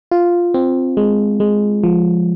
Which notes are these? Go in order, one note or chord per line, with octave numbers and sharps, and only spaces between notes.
F4
C4
G#3
G#3
F3